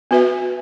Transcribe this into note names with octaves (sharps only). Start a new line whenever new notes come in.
B3 F#4 B4 E5